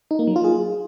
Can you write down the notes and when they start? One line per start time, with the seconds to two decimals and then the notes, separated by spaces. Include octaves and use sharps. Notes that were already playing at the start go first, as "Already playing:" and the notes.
0.11 D#4
0.19 A#3
0.27 F#3
0.36 F4
0.44 G#4